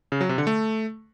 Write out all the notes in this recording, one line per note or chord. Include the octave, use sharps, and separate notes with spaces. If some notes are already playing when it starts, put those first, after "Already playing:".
C#3
F#3
C3
D3
A3